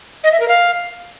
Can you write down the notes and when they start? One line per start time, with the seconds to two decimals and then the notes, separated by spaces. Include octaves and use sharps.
0.24 D#5
0.32 E5
0.40 A#4
0.48 F5